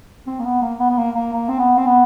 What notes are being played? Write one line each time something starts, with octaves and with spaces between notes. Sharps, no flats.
C4
A#3
B3
A#3
B3
B3
A#3
A#3
A#3
C4
B3
C4
B3